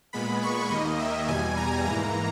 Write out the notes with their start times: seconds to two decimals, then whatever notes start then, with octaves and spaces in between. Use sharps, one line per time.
0.13 A#2 G#3 B3 B5
0.42 C#6
0.70 D#2 D#3 A#3 D#5
0.99 E5
1.28 E2 B2 G3 G#5
1.57 A#5
1.84 G#2 E3 A#3 A#5